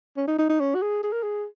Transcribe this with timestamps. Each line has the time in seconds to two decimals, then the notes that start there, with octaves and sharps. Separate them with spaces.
0.17 C#4
0.27 D#4
0.39 D#4
0.49 D#4
0.60 C#4
0.75 F#4
0.82 G#4
1.03 G#4
1.12 A#4
1.23 G#4